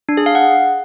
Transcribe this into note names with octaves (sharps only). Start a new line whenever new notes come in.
D4
G#4
F5
F#5